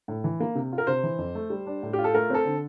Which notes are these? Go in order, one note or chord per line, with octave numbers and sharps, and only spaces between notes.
A2
E3
A#3
C3
F4
A#4
C3 C5
E3
F2
A3
G3
D4
A2
F4 G4
A4
A3 A#4
C4 A4
D3